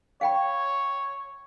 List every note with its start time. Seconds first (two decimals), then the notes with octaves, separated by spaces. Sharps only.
0.21 C#5 F5 G5 B5